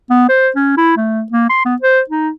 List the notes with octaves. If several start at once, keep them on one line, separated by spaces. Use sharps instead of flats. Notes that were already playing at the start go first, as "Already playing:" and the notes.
B3
C5
C#4
E4
A3
A#3
C6
B3
C5
D#4